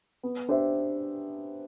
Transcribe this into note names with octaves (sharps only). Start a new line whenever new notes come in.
B3
D4 G4 C5 E5